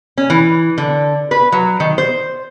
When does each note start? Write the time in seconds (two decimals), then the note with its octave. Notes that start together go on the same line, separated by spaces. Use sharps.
0.18 C#4
0.30 E3
0.78 D3
1.31 B4
1.52 F#3
1.80 D#3
1.98 C5